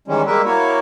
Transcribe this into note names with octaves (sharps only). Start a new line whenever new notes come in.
D#3 E3 G3 G#3 C#4
G3 G#3 A#3 A#4 B4 E5
A#3 E4 F#4 C#5